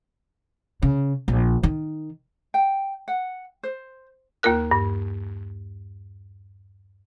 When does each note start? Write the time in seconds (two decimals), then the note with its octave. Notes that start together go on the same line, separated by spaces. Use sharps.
0.82 C#3
1.28 A#1
1.63 D#3
2.54 G5
3.08 F#5
3.63 C5
4.43 D#2 A#3 F4 A#4 F#6
4.71 G2